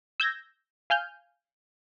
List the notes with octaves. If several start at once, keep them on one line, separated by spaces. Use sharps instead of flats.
E6 G6 G#6 A#6
F5 G#5 F6 G6